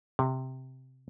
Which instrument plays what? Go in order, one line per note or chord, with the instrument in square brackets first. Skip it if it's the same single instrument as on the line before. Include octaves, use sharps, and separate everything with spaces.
[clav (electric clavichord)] C3